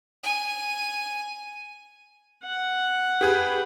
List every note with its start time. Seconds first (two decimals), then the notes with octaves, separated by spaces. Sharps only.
0.24 G#5
2.44 F#5
3.21 G4 G#4 B4